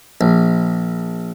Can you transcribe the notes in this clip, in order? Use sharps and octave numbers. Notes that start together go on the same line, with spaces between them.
A#1